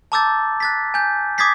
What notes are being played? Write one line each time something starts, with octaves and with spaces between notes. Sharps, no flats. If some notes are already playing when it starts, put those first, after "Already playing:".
A5 A#5 D6 E6 G6 A6
F#6 A6 B6
G#5 G6
D6 D#6 G#6 A6 B6 C7